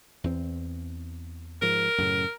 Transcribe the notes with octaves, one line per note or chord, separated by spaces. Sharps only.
E2 C4
G#2 F3 A#4
F#2 A2 C#3